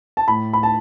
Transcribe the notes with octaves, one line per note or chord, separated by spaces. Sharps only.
A5
A2 B5
B5
A5